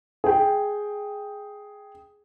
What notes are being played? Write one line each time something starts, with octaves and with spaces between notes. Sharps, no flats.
G#4 G5